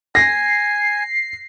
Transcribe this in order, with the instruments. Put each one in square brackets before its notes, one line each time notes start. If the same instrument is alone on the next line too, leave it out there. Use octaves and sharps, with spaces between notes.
[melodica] G#5 [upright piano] A#6 [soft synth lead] C7